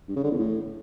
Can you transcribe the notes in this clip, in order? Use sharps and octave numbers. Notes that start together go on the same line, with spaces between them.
G2
C#3
D3
E2
A2